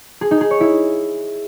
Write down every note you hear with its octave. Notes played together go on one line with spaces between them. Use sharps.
G#4
D#4
G#4
C#5
E4